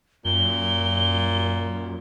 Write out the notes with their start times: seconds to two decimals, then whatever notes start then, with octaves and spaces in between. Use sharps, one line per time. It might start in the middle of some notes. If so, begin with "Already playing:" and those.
0.25 F#2 A#2 G7